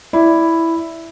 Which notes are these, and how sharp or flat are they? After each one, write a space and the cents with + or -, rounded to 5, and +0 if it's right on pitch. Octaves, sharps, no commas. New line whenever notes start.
E4 +0 D5 -5